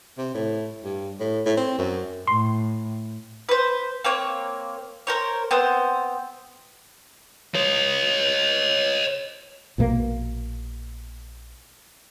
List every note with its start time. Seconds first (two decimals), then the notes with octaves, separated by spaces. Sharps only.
0.18 C3
0.34 A2
0.84 G2
1.20 A2
1.46 A2
1.57 C4
1.78 F#2
2.27 A2 C6
3.49 B4 C5
4.05 A#3 C4 C#5
5.07 A#4 C5 C#5
5.51 B3 C4 C5
7.54 C#5 D#5
9.78 A#1 B2 F3 A#3